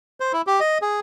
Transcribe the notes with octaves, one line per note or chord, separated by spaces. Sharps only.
C5
E4
G4
D#5
G#4